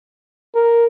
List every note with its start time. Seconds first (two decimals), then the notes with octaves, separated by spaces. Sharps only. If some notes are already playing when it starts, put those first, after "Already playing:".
0.55 A#4